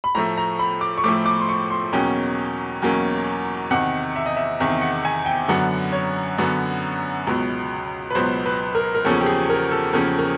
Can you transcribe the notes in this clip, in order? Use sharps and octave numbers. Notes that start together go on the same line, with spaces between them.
B5
A2 F3 A3 A#5
A#5
B5
D6
C#6
A2 F3 A3 D6
D6
C6
C#6
C6
E2 B2 F#3 A#3 C#4 G5
E2 B2 F#3 A#3 C#4
E2 C3 D#3 F#5
E5
D#5
E5
E2 C3 D#3 E5
F#5
G#5
G5
F#2 D3 F#3 B3 F#5
C#5
F#2 D3 F#3 B3
C#2 B2 F#3 B3
B4
C#2 B2 F#3 B3 C5
B4
A#4
A#4
E2 C#3 F3 A#3 C#4 A4
G4
G#4
A#4
A4
E2 C#3 F3 A#3 C#4 A#4
A#4